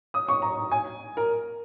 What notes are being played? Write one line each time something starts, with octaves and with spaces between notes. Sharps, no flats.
D#6
C#6
A#5
G#5
A#4